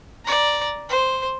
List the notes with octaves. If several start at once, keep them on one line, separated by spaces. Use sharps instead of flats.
D5 A#5
C5